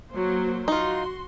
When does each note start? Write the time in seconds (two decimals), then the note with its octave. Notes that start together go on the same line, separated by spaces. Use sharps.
0.12 F#3 A#3 C5
0.68 D#4 F4 F#4 C6